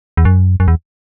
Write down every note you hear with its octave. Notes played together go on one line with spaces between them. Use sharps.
E2
F#2
F#2
E2